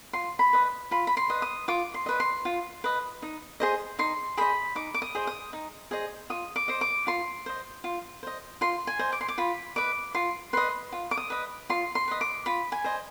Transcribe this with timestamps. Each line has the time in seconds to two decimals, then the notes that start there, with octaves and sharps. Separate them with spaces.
0.13 F4 C6
0.39 B5
0.53 B4 D#5
0.91 F4 B5
1.07 B5
1.17 C6
1.30 B4 D#5
1.42 D#6
1.68 F4 D6
1.94 C6
2.06 B4 D#5
2.20 C6
2.45 F4
2.84 B4 D#5
3.22 D#4
3.60 G#4 C5 D#5
3.99 D#4 C6
4.37 G#4 C5 D#5 B5
4.75 D#4 D6
4.94 D6
5.02 D#6
5.15 G#4 C5 D#5
5.27 D#6
5.53 D#4
5.91 G#4 C5 D#5
6.30 F4 D#6
6.56 D6
6.68 C5 D#5
6.81 D6
7.07 F4 C6
7.46 C5 D#5
7.84 F4
8.23 C5 D#5
8.61 F4 C6
8.87 G#5
8.99 C5 D#5
9.12 D6
9.21 C6
9.28 D6
9.38 F4 B5
9.76 B4 D#5 D6
10.14 F4 C6
10.53 B4 D#5 C6
10.92 F4
11.11 D6
11.17 D#6
11.30 B4 D#5
11.70 F4 C6
11.95 C6
12.08 B4 D#5
12.21 D6
12.46 F4 B5
12.72 G#5
12.84 C5 D#5